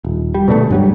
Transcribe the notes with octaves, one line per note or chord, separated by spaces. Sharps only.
D#1
G3
B2 D3 F3 A3
G2 F#3 G3